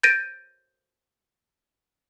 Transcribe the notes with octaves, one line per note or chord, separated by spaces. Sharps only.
G6 A6 A#6 D7 D#7